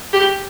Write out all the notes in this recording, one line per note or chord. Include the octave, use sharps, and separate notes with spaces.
G4